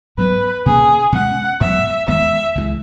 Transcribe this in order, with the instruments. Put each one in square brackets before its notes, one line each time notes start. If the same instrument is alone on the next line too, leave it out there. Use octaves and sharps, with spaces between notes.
[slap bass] G#2 F#3 B3 [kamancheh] B4
[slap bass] B2 A#3 C#4 [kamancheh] G#4
[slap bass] B2 G#3 C#4 [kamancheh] F#5
[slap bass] G#2 F#3 B3 [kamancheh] E5
[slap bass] E2 D#3 G#3 B3 [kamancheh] E5
[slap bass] C#2 C#3 E3 G#3